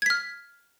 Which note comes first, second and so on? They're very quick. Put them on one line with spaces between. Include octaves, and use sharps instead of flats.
G#6 B6 F6